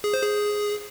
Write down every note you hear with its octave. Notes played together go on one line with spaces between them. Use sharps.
G#4
C5
G#4